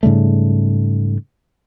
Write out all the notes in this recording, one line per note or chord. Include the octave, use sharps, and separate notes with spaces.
G#2 C#3 G3 A3